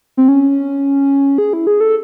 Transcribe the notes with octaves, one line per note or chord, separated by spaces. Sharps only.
C4
C#4
G#4
E4
G#4
A4